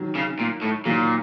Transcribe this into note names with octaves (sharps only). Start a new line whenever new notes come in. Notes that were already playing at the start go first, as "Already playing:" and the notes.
Already playing: D#3 F#3
C#3
A#2
A2
A#2 D#3 F#3